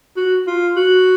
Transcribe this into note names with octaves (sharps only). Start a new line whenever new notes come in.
F#4
F4
F#4